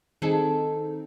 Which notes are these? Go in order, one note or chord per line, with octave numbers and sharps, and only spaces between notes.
D#3 C4 D#4 G#4 A4